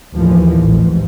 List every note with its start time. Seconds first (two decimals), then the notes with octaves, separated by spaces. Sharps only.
0.15 D#2 A2 E3 F3
0.65 A1 G#2